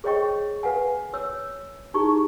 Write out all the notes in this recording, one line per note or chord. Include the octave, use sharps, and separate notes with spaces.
G#4 C5 C#5 D#5 G5 C#6
B4 F5 F#5 G#5
C#5 E6
D#4 E4 G4 G#4 C#6